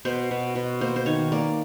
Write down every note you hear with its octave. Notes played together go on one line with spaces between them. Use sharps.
B2 C5
B2
B2
A#3 C5
C5
D#3 C#5
A#3 D5